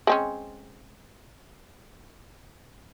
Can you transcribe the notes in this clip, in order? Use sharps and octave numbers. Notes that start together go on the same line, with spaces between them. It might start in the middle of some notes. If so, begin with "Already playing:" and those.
G#3 C4 C#4